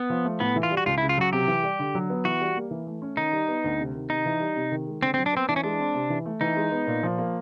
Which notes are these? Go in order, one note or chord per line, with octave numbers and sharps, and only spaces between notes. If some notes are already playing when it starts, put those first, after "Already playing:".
Already playing: B3
F3
A3
A2 B3
E3
F4
G3
F#4
C#2 F4
E4
C#3
F4
F#3 F#4
C3 G4
E3
G3
D3
F#3
B3
E3 F#4
G3
A#3
E3
A3
C#4
D#3 D#4
G3
B3
D2
C3
D#3
C3 D#4
E3
G3
C3
D#3
G#3
D3 C4
C4
F#3
D4
B3 C4
E3 D4
C#4
G#3 D4
C4
C3
E3
A3
E3 D#4
G#3
B3
A#2
F3
A#3